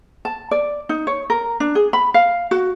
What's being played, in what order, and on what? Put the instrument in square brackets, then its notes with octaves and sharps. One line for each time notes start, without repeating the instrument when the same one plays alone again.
[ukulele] A5
D5
D#4
C#5
A#4
D4
G#4
B5
F5
F#4